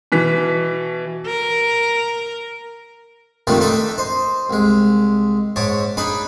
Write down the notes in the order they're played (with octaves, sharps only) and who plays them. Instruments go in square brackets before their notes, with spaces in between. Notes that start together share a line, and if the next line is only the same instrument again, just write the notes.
[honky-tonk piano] B2 E3 B6
[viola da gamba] A#4
[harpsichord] C3 D#3 G3 A3 D4 F4
D4 D#4 A4 D#5 E5
C5 D#5
C2 G#3
G#2 C#5 A5 D6
D4 D#4 G#4 B5